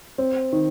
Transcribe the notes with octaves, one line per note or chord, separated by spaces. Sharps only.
C4
D#3